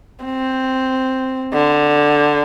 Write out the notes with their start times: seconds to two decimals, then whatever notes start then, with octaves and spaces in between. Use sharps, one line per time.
0.25 C4
1.54 D3